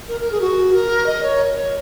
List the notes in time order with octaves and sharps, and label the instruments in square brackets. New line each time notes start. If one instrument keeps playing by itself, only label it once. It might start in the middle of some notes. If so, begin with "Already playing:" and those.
[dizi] A#4
A#4
G#4
F#4
A#4
D#5
C#5
C#5